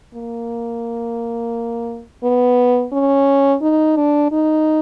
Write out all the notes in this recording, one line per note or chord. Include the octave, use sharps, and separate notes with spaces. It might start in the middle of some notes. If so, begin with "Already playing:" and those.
A#3
B3
C#4
D#4
D4
D#4